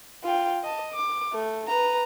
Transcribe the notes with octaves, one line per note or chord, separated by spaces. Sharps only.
F4 G5
D#5 A5
D6
A3
B4 A#5